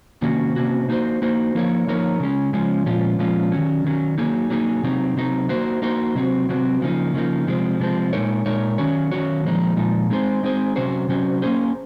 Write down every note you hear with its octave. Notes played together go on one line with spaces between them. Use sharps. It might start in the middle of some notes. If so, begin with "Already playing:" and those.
C3 D#3 A#3 C#4 F#4
C3 D#3 A#3 C#4 F#4
A#3 D#4 F#4 C5
A#3 D#4 F#4 C5
F3 A#3 D#4 A#4 C#5
F3 A#3 D#4 A#4 C#5
C#3 F3 G#3 C#4
C#3 F3 G#3 C#4
A#2 F3 G#3 C#4 F4
A#2 F3 G#3 C#4 F4
D#3 F#3 C#4
D#3 F#3 C#4
F#3 A#3 D#4 G#4
F#3 A#3 D#4 G#4
C3 F#3 C4 D#4
C3 F#3 C4 D#4
A#3 D#4 F#4 C5
A#3 D#4 F#4 C5
C3 F#3 C4 F#4
C3 F#3 C4 F#4
C#3 F3 A#3 D#4
C#3 F3 A#3 D#4
C3 F3 G#3 C4
C3 F3 G#3 C4
A#2 G#3 D#4 A#4 C#5
A#2 G#3 D#4 A#4 C#5
D#3 F#3 C#4 F#4 C#5
D#3 F#3 C#4 F#4 C#5
A#2 F3 G#3 D#4
A#2 F3 G#3 D#4
G#3 C4 D#4 G#4 C5
G#3 C4 D#4 G#4 C5
C3 F#3 C#4 F#4 C5
C3 F#3 C#4 F#4 C5
A#3 C#4 G#4 C5